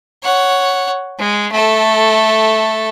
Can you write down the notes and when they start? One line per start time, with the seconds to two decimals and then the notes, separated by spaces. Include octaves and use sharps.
0.23 C#5 F#5
1.19 G#3
1.52 A3 A4